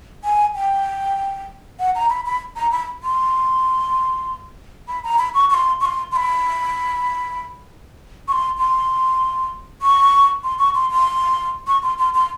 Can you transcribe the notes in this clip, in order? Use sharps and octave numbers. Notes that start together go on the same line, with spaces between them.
G#5
G5
F#5
A#5
B5
B5
A#5
B5
C6
B5
A#5
B5
C#6
C#6
C6
C#6
C6
C6
B5
C#6
C6
C6
C#6
C6
C#6
C6
C6
C#6
C6
C6
C6